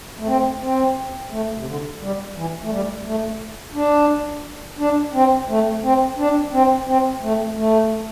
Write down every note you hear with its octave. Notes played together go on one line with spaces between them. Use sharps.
A3
C4
C4
A3
C3
D3
G3
E3
A3
G3
A3
D4
D4
C4
A3
C4
D4
C4
C4
A3
A3